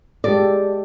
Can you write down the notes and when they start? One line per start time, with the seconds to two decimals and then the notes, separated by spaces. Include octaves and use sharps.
0.24 G#3 G4 A4 D5